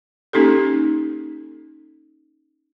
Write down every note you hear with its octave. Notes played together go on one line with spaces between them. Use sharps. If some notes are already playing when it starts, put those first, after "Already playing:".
A#3 C#4 D#4 G4 A4